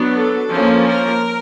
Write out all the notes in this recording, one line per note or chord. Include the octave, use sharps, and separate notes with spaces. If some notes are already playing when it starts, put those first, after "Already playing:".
Already playing: F#3 B3 D4
A4
F3 A#3 C#4
A#4